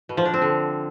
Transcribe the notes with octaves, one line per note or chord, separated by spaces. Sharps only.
B2
F3
D4
C4
D3